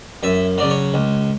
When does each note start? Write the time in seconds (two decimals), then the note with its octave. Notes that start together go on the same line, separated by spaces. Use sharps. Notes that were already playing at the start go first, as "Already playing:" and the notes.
0.23 F#2 E5
0.58 C#3 F#3 D5
0.70 C#5
0.94 C#2